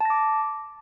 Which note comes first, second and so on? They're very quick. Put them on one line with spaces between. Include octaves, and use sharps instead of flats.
A5 A#6 D6